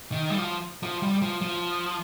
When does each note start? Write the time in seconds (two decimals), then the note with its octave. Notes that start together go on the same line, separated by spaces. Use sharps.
0.12 D#3
0.30 G3
0.38 F3
0.83 F3
1.03 G3
1.22 F3
1.41 F3